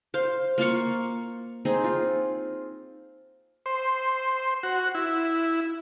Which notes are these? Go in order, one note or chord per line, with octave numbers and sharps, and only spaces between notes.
C5 F5
A#3 F4 F5 C#6
C4 D#4 G#4
F4
C5
F#4
E4